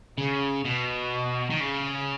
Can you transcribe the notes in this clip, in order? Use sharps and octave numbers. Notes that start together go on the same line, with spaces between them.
C#3
B2
D#3
C#3